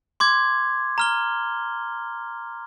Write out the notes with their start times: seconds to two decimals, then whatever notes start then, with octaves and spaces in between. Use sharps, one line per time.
0.20 C6 D6 G#6
0.98 A#5 F6 G7